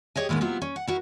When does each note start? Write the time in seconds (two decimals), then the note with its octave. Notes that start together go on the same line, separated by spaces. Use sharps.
0.16 G4 G#4 C#5 D#5 G#5
0.29 A2 D#3 G#3 A#3 B3
0.41 C3 F#3 B3 E4 F4 E5
0.62 C#4
0.76 F#5
0.87 E4 F#4 A#4